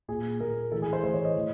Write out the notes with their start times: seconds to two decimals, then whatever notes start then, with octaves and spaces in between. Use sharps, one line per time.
0.08 A#2 G#4
0.40 A#2 A#4
0.72 A2 E3 A4
0.82 G#4
0.93 C5
1.03 A2 E3 C5
1.14 C#5
1.25 D#5
1.35 A2 E3